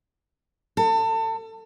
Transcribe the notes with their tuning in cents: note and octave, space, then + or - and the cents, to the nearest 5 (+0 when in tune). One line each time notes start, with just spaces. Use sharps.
A4 +30